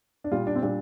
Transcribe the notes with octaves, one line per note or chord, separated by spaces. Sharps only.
D4
A#2 G3 F4
D4
C4
A#2 G3 D4